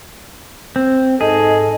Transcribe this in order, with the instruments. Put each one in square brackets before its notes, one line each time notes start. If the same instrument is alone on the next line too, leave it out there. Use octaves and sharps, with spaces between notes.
[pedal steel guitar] C4
[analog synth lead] G#2 [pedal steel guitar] G#4 [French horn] A4 [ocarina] D#5